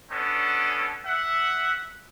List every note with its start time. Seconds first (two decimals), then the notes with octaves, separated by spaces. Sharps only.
0.11 B3 C#4 D4 A4
1.06 E5 F#5